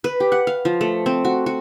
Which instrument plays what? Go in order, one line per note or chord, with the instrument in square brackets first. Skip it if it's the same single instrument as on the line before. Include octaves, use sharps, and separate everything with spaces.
[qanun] B4
G4
F#5
F5
F3
A3
C4
F#4
F#4